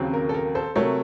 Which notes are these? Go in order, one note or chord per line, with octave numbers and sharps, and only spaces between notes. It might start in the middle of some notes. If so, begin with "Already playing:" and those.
Already playing: D#2 C#3 F#3 C4
A#4
A4
A#4
A4 C5
C3 F#3 A3 A#4 C#5